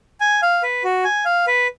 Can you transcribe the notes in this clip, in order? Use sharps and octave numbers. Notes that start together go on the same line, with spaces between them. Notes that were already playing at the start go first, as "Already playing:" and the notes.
G#5
F5
B4
F#4
G#5
F5
B4